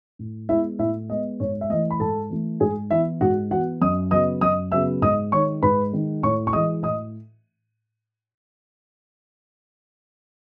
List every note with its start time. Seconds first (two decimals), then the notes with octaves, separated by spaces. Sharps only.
0.19 A2
0.49 G#3 B3 E4 E5
0.79 A2 E4 E5
1.10 G#3 B3 D#5
1.40 G#2 C#5
1.61 E5
1.69 E3 A3 D#5
1.90 B5
2.00 G#2 A4 A5
2.30 E3 A3
2.60 G#2 G#4 G#5
2.91 E3 B3 E4 E5
3.21 G#2 F#4 F#5
3.51 E3 B3 F#4 F#5
3.81 F#2 D#5 D#6
4.11 C#3 F#3 B3 D#5 D#6
4.41 F#2 D#5 D#6
4.72 C#3 F#3 B3 E5 E6
5.02 G#2 D#5 D#6
5.32 D#3 G#3 C#5 C#6
5.63 G#2 B4 B5
5.93 D#3 G#3
6.23 A2 C#5 C#6
6.47 C#6
6.53 E3 G#3 D#5 D#6
6.83 A2 D#5 D#6